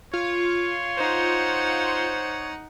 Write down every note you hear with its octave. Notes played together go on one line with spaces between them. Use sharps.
F4 C#5
D#4 C5 F#5